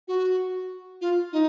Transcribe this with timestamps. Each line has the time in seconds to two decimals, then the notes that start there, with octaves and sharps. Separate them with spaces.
0.08 F#4
1.01 F4
1.32 D#4